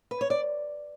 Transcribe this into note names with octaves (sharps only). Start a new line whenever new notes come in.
B4
C#5
D5